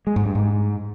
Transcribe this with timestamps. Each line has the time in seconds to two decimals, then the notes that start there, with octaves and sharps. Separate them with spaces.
0.07 G#3
0.16 G#2
0.26 G2
0.35 G#2